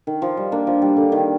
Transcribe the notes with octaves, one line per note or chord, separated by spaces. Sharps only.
D#3
F3
G3
A#3 D4
F3
G3
D3
D#3